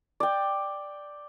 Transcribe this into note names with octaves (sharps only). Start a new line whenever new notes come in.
D5 G5